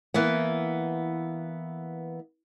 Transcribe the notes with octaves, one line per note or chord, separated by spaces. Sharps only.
E3 A#3 B3